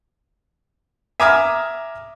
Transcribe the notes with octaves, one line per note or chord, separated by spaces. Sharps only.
E5 G#5 A#5 D6 D#6 F6